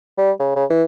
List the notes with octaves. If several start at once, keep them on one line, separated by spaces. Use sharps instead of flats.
G3
C#3
C#3
E3